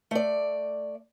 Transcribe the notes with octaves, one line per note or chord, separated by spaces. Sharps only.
A3 D5